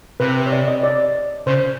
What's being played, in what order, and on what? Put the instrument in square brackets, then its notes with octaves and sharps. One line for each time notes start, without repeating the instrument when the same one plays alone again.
[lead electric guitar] C3 [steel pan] B4
[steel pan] C#5
D5
D#5
D5
[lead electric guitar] C#3 [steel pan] C5